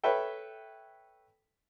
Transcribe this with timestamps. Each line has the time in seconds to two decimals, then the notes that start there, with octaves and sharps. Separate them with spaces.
0.04 A4 B4 C#5 E5 G5